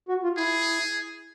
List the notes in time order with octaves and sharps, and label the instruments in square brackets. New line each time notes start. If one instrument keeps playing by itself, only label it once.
[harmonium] F#4
F4
[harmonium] E4 [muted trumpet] G#4